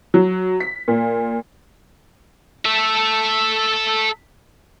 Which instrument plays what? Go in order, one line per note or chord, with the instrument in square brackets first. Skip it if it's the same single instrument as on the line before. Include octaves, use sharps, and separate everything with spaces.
[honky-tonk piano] F#3
B6
A#2
[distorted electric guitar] A4 E5